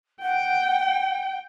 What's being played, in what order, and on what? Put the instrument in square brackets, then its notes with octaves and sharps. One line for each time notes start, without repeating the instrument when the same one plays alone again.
[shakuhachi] F#5 [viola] G5